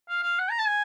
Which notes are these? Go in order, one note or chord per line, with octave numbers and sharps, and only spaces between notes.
F5
F5
F#5
A#5
A5
G#5